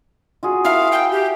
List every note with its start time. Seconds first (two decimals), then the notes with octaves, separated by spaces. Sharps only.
0.43 F4 F#4 G#4
0.65 E4 A#4 E5 F5
0.92 G5
1.12 G4